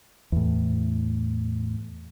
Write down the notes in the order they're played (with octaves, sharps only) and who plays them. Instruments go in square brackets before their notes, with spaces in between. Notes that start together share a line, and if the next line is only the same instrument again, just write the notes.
[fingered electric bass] E2 A2